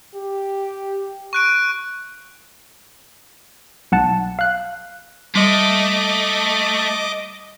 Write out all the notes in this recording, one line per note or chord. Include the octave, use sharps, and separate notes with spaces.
G4
C#6 F#6 D7
B1 F#5 A5
F5 F#6
G3 A3 D#5 D6